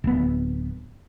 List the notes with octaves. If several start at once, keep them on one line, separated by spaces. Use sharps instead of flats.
D1 B3